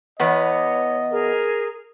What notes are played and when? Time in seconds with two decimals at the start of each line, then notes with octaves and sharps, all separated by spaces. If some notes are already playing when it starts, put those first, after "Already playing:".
0.20 E2 B3 C#5 D#5
1.10 G#4 A#4